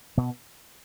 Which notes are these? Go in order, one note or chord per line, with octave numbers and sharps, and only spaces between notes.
B2 B3